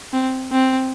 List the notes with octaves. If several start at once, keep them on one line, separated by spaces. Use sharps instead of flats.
C4
C4